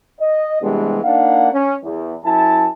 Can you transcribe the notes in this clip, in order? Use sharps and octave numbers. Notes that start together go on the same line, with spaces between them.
D#5
C3 E3 G3 G#3 B3 D4
A#3 D4 D#4 F5 F#5
C#4
E2
F#2 E4 G#5 A5